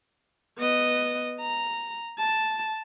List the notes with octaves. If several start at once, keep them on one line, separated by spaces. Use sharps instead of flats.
B3 D#5
A#5
A5